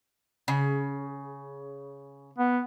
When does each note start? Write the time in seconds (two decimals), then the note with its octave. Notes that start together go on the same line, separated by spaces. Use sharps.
0.48 C#3
2.39 B3